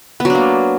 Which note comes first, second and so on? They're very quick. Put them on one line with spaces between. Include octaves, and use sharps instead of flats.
B3 F#3 D4 A#3